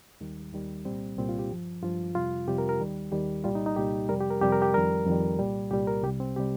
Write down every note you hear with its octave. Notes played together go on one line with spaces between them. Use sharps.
D#2 D#3 G3
D#2 D#3 G3
C2 A#2 G3 C4
C2 A#2 G3 C4
F4
G4
G2 F3
G2 F3 F4
F2 C3 G3 F4
F2 C3 G3 G4
A#4
A#4
D#2 D#3 G3
D#2 D#3 G3 G4
C2 A#2 G3 F4
D#4
D#4
C2 A#2 G3 G4
F2 C3 G3 A#4
G4
A#4
F2 C3 G3 G4
A#4
G4
F2 D#3 G3 A#4
F2 D#3 G3
C2 A#2 G3
C2 A#2 G3 G4
A#4
C2 C3 G3 G4
C4
C3 G3 G4